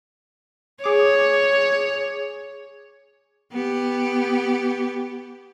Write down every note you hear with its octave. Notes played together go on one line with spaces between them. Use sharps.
G#4 C#5 D6
B3 G4